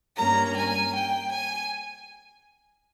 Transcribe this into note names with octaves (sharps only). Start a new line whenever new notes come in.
G2 G3 A#3 C#4 A#5
G#5
G5
G#5